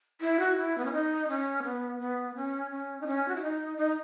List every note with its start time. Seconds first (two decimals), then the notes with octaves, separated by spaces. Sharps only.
0.21 E4
0.40 F#4
0.57 E4
0.78 B3
0.85 C#4
0.93 D#4
1.28 C#4
1.63 B3
1.99 B3
2.35 C#4
2.71 C#4
3.01 D#4
3.07 C#4
3.28 F#4
3.36 E4
3.42 D#4
3.77 D#4